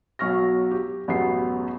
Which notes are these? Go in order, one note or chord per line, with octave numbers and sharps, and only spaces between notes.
B1 F#3 C#6 F6 A#6
G4
A1 F#2 B3 G4 G#4 C7